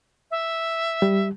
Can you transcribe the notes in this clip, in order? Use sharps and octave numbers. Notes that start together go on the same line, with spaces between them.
E5
G3